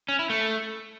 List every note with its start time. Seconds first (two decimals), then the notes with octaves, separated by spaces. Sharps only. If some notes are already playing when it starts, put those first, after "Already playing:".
0.09 C#4
0.19 E4
0.30 A3